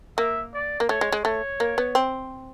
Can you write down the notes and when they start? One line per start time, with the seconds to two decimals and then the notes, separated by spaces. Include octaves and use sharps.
0.17 A#3 E5
0.54 D5
0.80 A#3
0.89 A3 C#5
1.01 G#3
1.12 G#3
1.24 A3 C#5
1.60 A#3
1.78 B3
1.95 C4